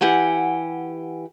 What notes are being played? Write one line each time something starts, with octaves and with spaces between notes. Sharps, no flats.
E3 G4 F#5 G#5